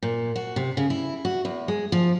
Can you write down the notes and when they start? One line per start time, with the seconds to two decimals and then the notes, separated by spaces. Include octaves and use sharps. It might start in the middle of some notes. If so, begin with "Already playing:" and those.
0.03 A#2
0.36 F#4
0.56 C3
0.77 C#3
0.90 E4
1.25 F#4
1.45 E2
1.68 G#3
1.92 F3